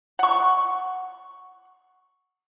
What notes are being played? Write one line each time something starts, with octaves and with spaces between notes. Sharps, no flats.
F#5 C#6